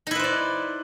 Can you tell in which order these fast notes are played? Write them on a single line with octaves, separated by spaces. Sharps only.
D#4 E4 B4 C5 D5